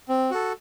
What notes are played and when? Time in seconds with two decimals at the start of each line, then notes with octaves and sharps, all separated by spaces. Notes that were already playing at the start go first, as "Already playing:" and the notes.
0.09 C4
0.31 F#4 A4